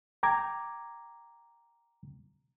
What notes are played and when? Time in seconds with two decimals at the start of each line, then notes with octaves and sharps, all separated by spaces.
0.23 G5 A#5 D6 G#6